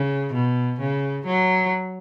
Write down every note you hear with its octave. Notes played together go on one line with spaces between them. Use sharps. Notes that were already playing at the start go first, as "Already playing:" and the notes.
Already playing: C#3
B2
C#3
F#3